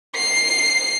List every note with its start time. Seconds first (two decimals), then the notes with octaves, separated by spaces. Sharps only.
0.16 C7